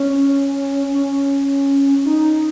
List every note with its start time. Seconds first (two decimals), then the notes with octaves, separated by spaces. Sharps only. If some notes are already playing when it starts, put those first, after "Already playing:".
Already playing: C#4
0.94 C#4
2.05 D#4